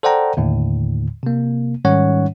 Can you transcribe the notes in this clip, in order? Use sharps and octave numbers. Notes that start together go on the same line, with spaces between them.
A4 C5 D5 F#5 G5 A#5
D#2 A2 D3
C3 A#3
G#2 D#3 G3 C#4 C#5 F#5